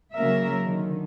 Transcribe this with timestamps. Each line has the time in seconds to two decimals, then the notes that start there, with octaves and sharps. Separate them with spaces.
0.15 C#3 F#3 A#3 A#4 E5
0.63 D3 D#3